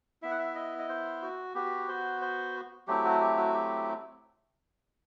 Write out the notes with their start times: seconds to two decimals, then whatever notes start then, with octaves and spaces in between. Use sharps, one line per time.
0.22 B3 E4 E5
0.31 F#5
0.39 E5
0.55 D#5
0.78 D#5
0.89 C5
1.22 F#4
1.55 B3 F#4 G4
1.88 C5
2.22 C5
2.87 F#3 A3 C4 E4 G4
3.04 F#4
3.20 G4
3.37 F#4
3.54 G4